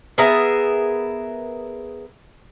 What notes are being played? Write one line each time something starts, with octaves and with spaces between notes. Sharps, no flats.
B3 G#4 A#4 E5